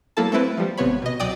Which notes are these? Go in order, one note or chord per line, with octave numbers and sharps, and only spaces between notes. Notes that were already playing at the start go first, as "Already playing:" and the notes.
F#3 A#3 E4 A4 A5
A3 C4 E4 B4
F3 G3
G#1 C3 B3 C#5 B5
B2 D#5
C2 F#3 D5 G5 D#6